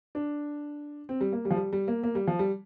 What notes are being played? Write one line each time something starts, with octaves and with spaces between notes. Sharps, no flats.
D4
C4
G3
A#3
G3
F3
G3
G3
A#3
A#3
G3
F3
G3